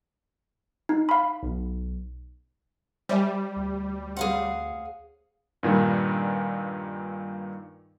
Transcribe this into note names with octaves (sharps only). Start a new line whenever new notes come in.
D#4
F5 B5
B1
G3 C5 E5 G#5
D2
C4 C#4 G#4 F5 F#5
G2 A#2 D#3 G3